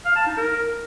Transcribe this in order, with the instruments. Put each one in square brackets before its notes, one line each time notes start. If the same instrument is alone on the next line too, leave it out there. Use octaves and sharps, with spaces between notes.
[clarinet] F5
A5
D#4
A#4